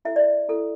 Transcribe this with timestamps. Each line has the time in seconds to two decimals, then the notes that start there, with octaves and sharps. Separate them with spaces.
0.05 E4 A4 E5
0.16 D5
0.48 E4 A4